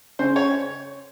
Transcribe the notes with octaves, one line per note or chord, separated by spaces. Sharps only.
C#3 C5
C#5